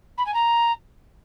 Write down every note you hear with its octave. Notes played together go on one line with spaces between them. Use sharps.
B5
G#5
A#5